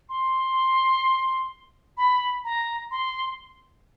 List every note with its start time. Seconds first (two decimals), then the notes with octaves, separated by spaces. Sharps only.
0.09 C6
1.97 B5
2.44 A#5
2.91 C6